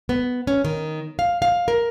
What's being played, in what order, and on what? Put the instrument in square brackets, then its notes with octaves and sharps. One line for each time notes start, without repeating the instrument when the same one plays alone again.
[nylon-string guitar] B3
C#4
D#3
F5
F5
A#4